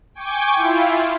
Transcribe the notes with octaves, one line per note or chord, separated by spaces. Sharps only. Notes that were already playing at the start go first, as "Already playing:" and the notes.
G5 G#5 C#6 D6 G6
E4 F4